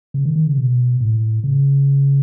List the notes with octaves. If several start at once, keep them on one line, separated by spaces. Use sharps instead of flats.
C#3
D#3
D#3
C#3
B2
A2
C#3